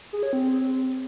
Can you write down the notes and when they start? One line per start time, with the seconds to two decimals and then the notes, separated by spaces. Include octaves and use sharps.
0.13 G#4
0.23 C#5
0.33 C4
0.43 C4